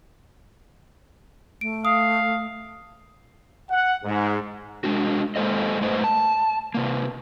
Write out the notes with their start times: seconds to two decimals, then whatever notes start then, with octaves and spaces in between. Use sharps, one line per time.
1.61 A3 D7
1.85 F5 D#6
3.70 F#5
4.04 G#2
4.84 G#3 D4 F#4
5.36 G#3 A#3 A4 C5 D#5
5.81 G#2 A3 B4 C5 D#5
6.04 A5
6.75 C3 A#3